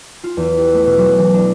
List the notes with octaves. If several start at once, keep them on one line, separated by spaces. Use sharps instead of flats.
F4
E2
G4
A3
B2
F#3
E3
D4